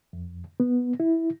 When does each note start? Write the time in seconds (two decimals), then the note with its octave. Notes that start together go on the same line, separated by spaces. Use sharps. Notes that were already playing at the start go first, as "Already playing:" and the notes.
0.13 F2
0.60 B3
1.00 E4